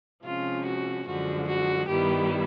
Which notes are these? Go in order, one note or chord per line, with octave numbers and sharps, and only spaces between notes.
C3 F3 G#3 C#4 F4
F#4
F#2 D3 F3 G#3 F#4
F#4
G2 D#3 G3 B3 E4 G4